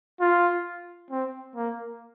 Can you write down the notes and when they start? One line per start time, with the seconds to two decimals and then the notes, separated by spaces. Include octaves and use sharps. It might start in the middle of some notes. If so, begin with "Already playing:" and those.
0.20 F4
1.11 C4
1.56 A#3